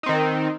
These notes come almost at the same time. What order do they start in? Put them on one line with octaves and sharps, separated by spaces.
D#4 C4 D#3